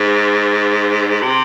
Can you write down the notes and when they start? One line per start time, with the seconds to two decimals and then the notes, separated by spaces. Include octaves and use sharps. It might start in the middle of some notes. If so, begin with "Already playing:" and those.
Already playing: G#2
1.22 C3